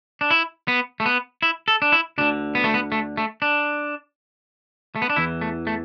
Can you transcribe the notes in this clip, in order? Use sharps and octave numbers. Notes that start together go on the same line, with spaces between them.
D4
E4
B3
A3
B3
E4
A4
D4
E4
D2 D3 D4
B3
A3
B3
A3
A3
D4
A3
B3
D4
E2 E3 E4
A3
A3